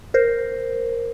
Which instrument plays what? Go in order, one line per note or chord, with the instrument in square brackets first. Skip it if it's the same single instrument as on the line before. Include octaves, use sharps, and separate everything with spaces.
[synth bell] A#4 C5